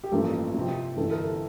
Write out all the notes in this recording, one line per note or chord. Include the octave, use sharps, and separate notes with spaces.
G4
A1 G2 F3 A#3 A4
F2 C3 F3 C4
G1 G2 E3 A4
A#4
A4